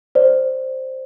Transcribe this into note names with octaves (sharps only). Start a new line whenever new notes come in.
C5 D5